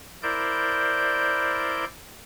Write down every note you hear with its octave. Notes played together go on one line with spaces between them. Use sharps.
E4 A#4 C5 D5 G6